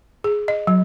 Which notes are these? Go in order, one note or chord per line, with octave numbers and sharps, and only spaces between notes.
G#4
D#5
F#3